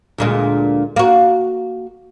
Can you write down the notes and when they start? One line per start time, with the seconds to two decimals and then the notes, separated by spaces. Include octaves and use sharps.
0.18 D2 A#2 G#3
0.96 A#3 F#4